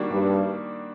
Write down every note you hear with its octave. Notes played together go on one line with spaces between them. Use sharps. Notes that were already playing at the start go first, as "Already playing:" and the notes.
Already playing: D#3 G3 A#3 D4 F#4
G2